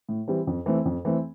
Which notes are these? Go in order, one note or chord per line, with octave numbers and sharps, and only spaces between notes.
A2
E3 G3 C4
F2
E3 A3 C4
F2
E3 A3 C4